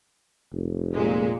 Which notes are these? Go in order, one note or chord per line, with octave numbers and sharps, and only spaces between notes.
F1
A#2 G#3